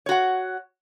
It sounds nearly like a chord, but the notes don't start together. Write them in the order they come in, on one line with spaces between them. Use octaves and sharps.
C#5 F#4 F#5